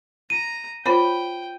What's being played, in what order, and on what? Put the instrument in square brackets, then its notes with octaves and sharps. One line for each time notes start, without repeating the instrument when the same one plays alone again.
[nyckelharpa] A#5 [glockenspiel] D#7
[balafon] F4 C5 C#5 [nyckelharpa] G5 [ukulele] B5